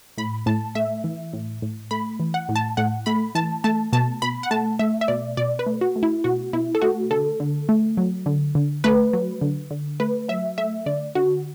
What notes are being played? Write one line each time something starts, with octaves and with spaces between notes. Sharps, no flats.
A2 B5
A2 A5
A3 E5
E3
A2
A2
A3 B5
E3
F#5
A2
A5
A2 F#5
A3 B5
E3 A5
A3 A5
B2 A5
B2 B5
F#5
A3 A5
A3 E5
E5
B2 D5
B2 D5
B4
A3
F#4
A3
E4
B2 F#4
B2 E4
A4
A3 F#4
D3 A4
D3
A3
F#3
D3
D3
A3 B4
F#3
D3
D3
A3 B4
F#3 E5
A3 E5
D3 D5
D3 F#4